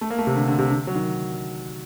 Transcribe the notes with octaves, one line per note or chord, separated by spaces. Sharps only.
A3
A#3
A3
C3
D3
D3
C3
D3
F#3
D#3